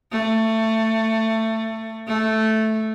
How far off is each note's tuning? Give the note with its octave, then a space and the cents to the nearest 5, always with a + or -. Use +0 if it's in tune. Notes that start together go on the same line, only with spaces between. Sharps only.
A3 +20
A3 -5